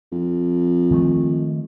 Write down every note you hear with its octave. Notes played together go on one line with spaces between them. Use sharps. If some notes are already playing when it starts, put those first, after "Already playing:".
F2
D#3 G#3 A3